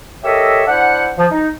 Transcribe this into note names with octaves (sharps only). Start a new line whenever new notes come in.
G4 A4 A#4 C#5 D#5 E5
D4 E4 C5 F#5
F3
D#4